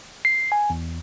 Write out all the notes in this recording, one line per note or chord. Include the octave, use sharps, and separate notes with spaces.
C7
G#5
E2